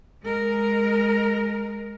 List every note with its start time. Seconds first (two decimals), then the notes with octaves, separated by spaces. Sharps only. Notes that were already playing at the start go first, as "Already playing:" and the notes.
0.23 G#3 A#4